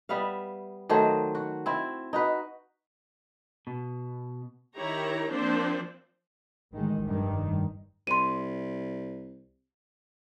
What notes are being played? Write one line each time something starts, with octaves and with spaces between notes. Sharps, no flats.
G3 B3 E5 F5
D#3 F#3 A3 C5
F#4
C4 E4
D#4 F#4 B4
B2
D#3 E4 G4 C#5 A#5
F3 A#3 C4 D4 C5
A1 D#3 G#3
F1 G2 D#3
C2 C6 D#7